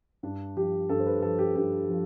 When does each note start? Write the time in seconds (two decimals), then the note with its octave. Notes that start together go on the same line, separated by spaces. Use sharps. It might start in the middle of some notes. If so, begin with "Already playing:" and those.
0.23 G2 D4
0.57 F3 G4
0.89 G2 A4
0.99 C5
1.06 B4
1.22 F3 A4
1.38 G4
1.55 G2 G4
1.89 F3